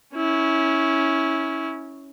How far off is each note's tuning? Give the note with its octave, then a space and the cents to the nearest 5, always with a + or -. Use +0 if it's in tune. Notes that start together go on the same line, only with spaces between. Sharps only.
C#4 +0 E4 -25